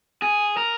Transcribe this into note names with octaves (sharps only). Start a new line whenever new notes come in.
G#4
A#4